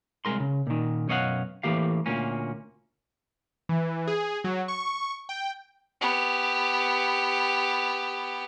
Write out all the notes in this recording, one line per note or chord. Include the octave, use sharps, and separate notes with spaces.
C2 G#3 A#4 C6
C#3
A#2 D#3
F#2 B2 C#5 D#5 F5 F#5
A2 E3 A#3 G4 F5
D2 A#2 A#3 C#4
E3
G#4
F#3
C#6
G5
B3 G4